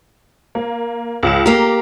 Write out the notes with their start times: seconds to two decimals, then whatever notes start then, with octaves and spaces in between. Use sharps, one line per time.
0.55 A#3
1.23 C#2 E7
1.46 A#3 G4 A#5